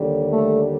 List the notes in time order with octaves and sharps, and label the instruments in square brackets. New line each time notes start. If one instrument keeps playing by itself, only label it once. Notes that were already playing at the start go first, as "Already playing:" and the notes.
Already playing: [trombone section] D#2 D3 G3
A3